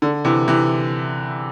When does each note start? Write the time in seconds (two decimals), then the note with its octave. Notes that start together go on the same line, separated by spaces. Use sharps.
0.02 D3
0.25 C3 E3
0.48 C3 E3